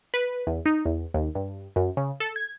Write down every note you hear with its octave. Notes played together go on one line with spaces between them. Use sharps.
B4
E2
D#4
E2
D#2
G2
F#2
C#3
A4
G#6